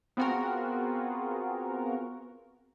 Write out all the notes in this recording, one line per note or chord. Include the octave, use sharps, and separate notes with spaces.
B3 C4 F4 F#4 G#4 A#4